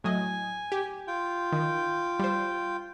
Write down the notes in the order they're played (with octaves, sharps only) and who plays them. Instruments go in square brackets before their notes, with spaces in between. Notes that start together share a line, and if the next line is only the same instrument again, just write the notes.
[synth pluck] A2 F#3 D#5 [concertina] G#5
[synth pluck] G4
[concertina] F4 G5
[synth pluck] D#3
G3 C5